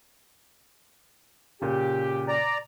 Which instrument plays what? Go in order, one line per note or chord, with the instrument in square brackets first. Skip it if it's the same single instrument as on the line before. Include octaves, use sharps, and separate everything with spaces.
[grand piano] A#2 C#3 [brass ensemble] G4
[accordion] D5 A#5